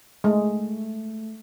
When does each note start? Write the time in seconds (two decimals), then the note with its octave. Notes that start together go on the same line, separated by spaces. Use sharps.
0.24 G#3 A3